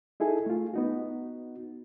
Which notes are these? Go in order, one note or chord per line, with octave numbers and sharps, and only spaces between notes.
D#4 E4 G#4 A4 G#5
A3 F4
B3 D#4 F#4